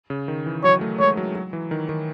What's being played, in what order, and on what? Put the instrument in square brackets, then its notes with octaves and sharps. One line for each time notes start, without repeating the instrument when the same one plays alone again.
[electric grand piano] C#3
D#3
E3
[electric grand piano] F#3 [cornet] C#5
[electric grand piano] A3
[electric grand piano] G#3 [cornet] C#5
[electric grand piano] F#3
F#3
E3
D#3
D#3